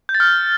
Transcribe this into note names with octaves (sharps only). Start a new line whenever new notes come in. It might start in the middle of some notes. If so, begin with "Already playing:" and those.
G6
A6
F6